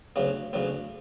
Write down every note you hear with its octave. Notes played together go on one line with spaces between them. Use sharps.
D2 C#3 F#3 B3
D2 C#3 F#3 B3